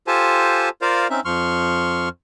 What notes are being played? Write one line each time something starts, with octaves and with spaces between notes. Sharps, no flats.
F4 G4 A4 C5 G#5 A5
F4 A#4 C5 D5 F5
C4 C#4 D#4 E5
F2 F3 C6 C#6 F6